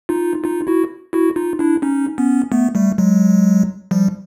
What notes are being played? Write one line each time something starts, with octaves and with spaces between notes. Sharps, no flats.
D#4 F4
D#4 F4
E4 F#4
E4 F#4
D#4 F4
D4 E4
C#4 D#4
B3 C#4
A3 B3
G3 A3
F#3 G#3
F3 G3